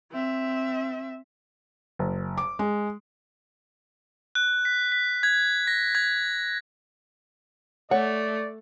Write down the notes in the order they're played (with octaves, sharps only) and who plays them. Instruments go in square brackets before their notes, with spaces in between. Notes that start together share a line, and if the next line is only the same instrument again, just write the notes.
[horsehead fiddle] C4 E5
[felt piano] F#1
D6
G#3
[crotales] F#6
B6
B6
G#6
A#6
G#6
[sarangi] A3 [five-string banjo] C#5 [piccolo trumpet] D5 [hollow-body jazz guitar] F#5